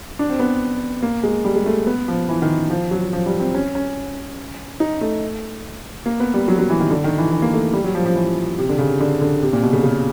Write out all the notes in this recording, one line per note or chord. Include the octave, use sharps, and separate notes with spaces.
D4
C4
B3
A#3
G#3
G3
G#3
A3
B3
F3
E3
D#3
F3
F#3
F3
G3
C4
C#4
C#4
D#4
A3
A#3
B3
G3
F#3
F#3
E3
D#3
D3
D#3
E3
E3
A#3
A3
G3
F#3
F3
F3
E3
C3
D3
C#3
D3
D3
C3
A#2
B2
C#3
C#3